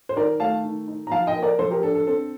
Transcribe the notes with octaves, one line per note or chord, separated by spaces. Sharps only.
C5
D#3 A#4 D5
A3 F5 A5
D#3
D#4
A#5
F3 F5 A5
D#5 G5
A#3
A#4 D5
F3 A4 C5
G4 A#4
D4 A4
A4
C4 A4